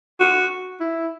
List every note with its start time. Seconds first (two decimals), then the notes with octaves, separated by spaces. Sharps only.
0.20 F#4
0.80 E4